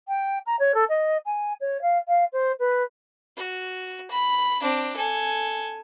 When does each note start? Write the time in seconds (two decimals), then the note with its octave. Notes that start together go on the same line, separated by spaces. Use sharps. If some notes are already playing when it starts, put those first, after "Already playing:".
0.08 G5
0.46 A#5
0.59 C#5
0.74 A4
0.89 D#5
1.26 G#5
1.60 C#5
1.82 F5
2.08 F5
2.33 C5
2.59 B4
3.37 F#4
4.10 B5
4.61 C4 D4
4.96 A4 G#5